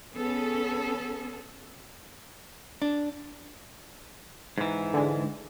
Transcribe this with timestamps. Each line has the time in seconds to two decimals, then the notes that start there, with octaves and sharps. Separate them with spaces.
0.13 B3 C#4 G#4 A4
2.82 D4
4.58 G#2 E3
4.94 D3 G#3